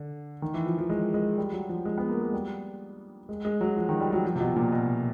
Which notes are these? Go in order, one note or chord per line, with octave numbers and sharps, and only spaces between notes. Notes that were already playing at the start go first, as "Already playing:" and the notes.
Already playing: D3
D#3
E3
F3
F3
G#3
G#3
G3
F#3
F3
G#3
B3
A#3
G#3
G3
G#3
G#3
F#3
F3
D#3
G3
F#3
F3
C3
B2
A#2
B2